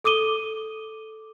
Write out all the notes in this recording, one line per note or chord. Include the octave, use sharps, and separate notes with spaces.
A4 D6 D#6 D#7 G7